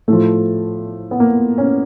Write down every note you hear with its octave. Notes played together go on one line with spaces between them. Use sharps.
A2 F3 A3
B3
A#3
C#4